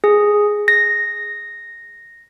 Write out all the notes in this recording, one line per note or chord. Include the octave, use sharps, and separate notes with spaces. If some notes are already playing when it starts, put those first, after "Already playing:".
G#4
A#6